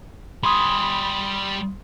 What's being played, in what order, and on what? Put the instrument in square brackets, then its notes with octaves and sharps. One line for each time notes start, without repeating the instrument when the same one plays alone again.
[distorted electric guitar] G3 G#5 [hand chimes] B5 C6 D#6